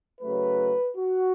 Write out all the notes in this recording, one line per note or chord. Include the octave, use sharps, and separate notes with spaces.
C#3 F#3 A3 B4
F#4